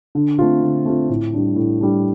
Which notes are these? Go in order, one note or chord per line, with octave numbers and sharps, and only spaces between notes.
D3
A3 C4 F4
D3
A3 C4 F4
A2
G3 D4
A2
G3 D4